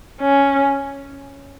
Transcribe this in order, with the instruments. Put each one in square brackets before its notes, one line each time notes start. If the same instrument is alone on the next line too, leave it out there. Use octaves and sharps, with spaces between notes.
[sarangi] C#4